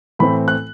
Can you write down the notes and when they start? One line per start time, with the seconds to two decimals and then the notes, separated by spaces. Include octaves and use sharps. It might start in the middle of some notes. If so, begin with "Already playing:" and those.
0.19 A2 E3 A3 C4 B5
0.48 F#6